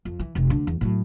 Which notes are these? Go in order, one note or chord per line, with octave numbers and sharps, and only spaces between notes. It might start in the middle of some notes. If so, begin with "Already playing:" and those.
F2
E3
F1 C3
D2 D3
E2
A2 F#3